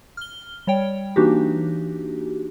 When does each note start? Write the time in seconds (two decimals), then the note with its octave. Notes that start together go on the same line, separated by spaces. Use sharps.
0.17 F6 G7
0.67 G3 C#5 G5
1.16 E3 A#3 D4 D#4 F#4 G4